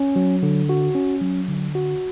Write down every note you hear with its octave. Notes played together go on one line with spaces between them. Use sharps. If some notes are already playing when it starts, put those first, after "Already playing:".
Already playing: C#4
F#3
D3
F#4
C#4
F#3
D3
F#4